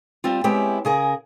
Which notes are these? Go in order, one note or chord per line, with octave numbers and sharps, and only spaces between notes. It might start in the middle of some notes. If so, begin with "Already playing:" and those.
G3 C4 F4
G#3 B3 C4 E4 G4 C#5
C#3 G#4 A#4